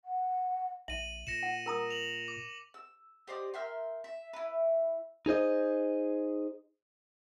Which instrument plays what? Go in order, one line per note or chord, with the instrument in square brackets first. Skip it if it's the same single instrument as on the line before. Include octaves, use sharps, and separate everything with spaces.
[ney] F#5
[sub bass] A#1 [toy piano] E5 [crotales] D#7 F#7
[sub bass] A#2 [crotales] A#6 C#7 E7
[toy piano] F#5
A#4 A#5 D#6
[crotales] F7 F#7
D6
[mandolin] E6
G4 C5 D5 D#5
A#4 E5 G5 C6
E5
E4 B4
[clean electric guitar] D#4 G#4 C5 D#5